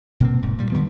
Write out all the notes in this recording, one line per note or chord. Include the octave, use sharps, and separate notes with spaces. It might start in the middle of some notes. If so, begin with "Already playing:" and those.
B2 A#3 C4
E1 G#2
A#2 G3
D3 F3 G3 B3